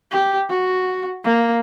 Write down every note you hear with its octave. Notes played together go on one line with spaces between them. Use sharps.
G4
F#4
A#3